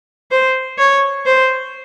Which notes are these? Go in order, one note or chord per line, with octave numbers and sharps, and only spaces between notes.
C5
C#5
C5